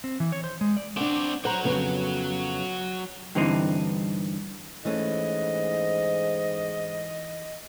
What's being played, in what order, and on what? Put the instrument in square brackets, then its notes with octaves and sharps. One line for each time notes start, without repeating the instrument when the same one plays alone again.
[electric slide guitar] C4
E3
C#5
C5
G#3
D5
[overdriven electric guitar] C4 D5 [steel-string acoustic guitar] D4 F#5
[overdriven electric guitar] F#3 F#5 [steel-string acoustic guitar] C5 A#5
[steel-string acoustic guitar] F2 C#3 B3
[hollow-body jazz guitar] G2 D3 E3 C4 D#4
[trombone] G#2 [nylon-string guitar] E3 A3 C#4 [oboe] D#5